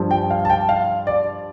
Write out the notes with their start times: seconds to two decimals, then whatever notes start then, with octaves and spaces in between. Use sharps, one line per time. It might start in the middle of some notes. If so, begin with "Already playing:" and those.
Already playing: G2 F3
0.11 G5
0.31 F5
0.45 A5
0.50 G5
0.69 F5
1.07 D5